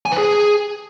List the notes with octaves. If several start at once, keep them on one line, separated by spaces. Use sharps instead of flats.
G#5
B4
G#4